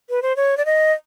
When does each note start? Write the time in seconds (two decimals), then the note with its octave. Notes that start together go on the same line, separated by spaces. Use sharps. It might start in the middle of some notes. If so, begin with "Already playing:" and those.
0.10 B4
0.22 C5
0.36 C#5
0.57 D5
0.65 D#5